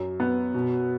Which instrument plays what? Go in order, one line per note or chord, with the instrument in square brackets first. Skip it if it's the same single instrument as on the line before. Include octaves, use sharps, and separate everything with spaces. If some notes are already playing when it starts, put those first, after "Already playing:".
Already playing: [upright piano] F#2
B3
B2